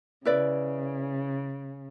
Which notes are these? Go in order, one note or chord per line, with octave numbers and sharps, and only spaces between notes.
C#3 E4 B4 D5